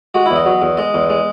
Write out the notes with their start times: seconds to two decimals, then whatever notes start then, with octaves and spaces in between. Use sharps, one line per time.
0.14 G#3 F#4
0.26 E4
0.31 E2
0.36 D#5
0.46 F#3
0.62 E2
0.77 G#3 D#5
0.94 E2
1.10 G#3